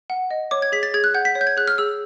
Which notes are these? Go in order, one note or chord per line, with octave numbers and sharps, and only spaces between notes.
F#5
D#5
C#5 D6
G#6
G#4 B6
A6
G#4 G#6
F#6
F#5 G6
B6
C#5
G6
G#6
G#4 F#6
F6
G#4 E6